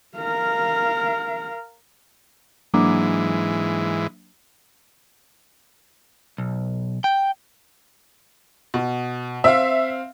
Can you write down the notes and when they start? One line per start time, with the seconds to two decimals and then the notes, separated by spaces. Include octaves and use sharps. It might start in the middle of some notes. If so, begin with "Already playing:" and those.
0.18 A#4 F5
2.74 G#2 E3 F#3 A#3 D4
6.38 B1
7.04 G5
8.74 B2
9.44 C4 E5 F5 E6